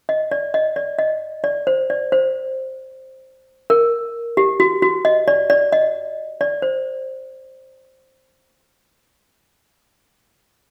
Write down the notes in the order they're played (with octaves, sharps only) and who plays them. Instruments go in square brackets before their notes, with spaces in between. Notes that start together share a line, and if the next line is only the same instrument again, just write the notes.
[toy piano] D#5
D5
D#5
D5
D#5
D5
C5
D5
C5
A#4
G4
F#4
F#4
D#5
D5
D5
D#5
D5
C5